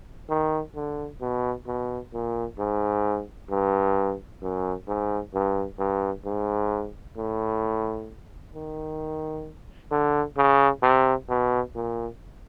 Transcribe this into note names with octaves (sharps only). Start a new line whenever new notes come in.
D#3
D3
B2
B2
A#2
G#2
G2
F#2
G#2
G2
G2
G#2
A2
D#3
D3
C#3
C3
B2
A#2